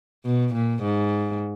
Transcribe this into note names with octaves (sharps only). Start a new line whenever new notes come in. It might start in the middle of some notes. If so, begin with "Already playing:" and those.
B2
A#2
G#2